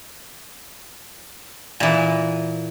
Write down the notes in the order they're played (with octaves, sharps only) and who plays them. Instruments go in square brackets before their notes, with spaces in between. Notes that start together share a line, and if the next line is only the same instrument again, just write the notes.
[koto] A#2 E3